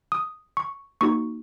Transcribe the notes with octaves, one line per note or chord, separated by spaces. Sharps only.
D#6
C#6
A#3 D#4 F#4 C#6